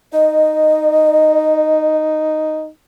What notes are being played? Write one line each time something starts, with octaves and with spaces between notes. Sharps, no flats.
D#4 D#5